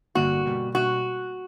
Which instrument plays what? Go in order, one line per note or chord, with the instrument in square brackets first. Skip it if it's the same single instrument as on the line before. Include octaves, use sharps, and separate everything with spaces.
[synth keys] A1 G2 D3 G3 A#3 [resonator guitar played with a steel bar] F#4
[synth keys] B2 G3 A#3
[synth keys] B2 G3 A#3 [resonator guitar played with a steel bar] F#4